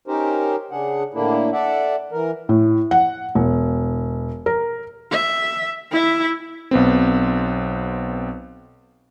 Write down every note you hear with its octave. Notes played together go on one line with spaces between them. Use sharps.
C#4 D#4 G4 A#4 C5
C#3 D4 G#4 F#5
A2 D3 A#3 D4 E4
A4 D5 E5 F#5
E3 A#4
A2
F#5
E1
A#4
E5
E4 E5
B1 B3 C4